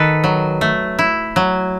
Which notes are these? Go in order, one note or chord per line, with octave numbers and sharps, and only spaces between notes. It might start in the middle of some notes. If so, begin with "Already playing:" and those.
Already playing: D#3 A4 B4
F#3
A3
E4
F#3